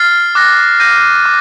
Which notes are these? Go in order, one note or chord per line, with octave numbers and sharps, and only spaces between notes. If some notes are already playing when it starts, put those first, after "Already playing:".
Already playing: F6 A6 C7
D6 F#6 A#6
G6 A#6 D#7
D6